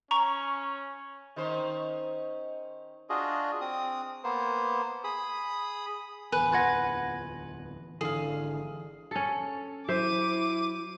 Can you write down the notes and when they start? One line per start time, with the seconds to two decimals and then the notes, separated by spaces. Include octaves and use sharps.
0.11 C#4 A#5 C#6
1.36 D#3 C#4 C5
3.09 D4 F4 F#4 G#4 D#5
3.61 C4 D#6
4.24 A#3 B3 C5
5.04 G#4 B5 D#6
6.32 D1 E2 B4 G#5 F#6
6.52 F4 F#5 F#6 G#6 A#6
8.01 G#1 D3 E3 G#4 A4 F5
9.11 C#4 A4
9.88 F#3 E4 C5 E5 D6 D#7